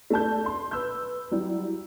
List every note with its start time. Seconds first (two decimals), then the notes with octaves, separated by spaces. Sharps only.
0.10 A3 D4 A5 G6
0.46 C6
0.71 B4 E6 G6
1.31 F#3 G3 E4